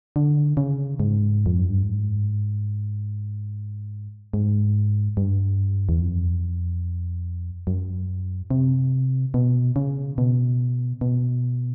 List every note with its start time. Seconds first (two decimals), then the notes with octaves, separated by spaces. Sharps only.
0.16 D3
0.57 C#3
1.00 G#2
1.46 F2
1.58 F#2
1.70 G2
1.83 G#2
4.34 G#2
5.17 G2
5.89 E2
6.01 F2
7.67 F#2
8.51 C3
9.34 B2
9.76 C#3
10.18 B2
11.01 B2